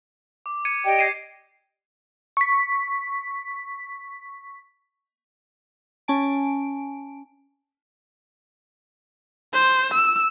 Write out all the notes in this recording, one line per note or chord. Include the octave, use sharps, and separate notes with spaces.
D6
G#6 C#7 D#7
G4 D5 D#5 G5
G#6 C7 D#7
C#6 B6
C#4 G#5 A5 D7
C5
E6